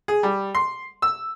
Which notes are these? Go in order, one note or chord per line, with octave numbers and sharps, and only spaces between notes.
G#4
G3
C6
E6